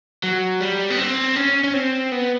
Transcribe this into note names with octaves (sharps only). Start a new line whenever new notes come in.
F#3
G3
B3
C4
C#4
C#4
C4
B3